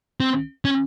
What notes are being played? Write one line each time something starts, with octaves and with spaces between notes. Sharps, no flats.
C4
C#4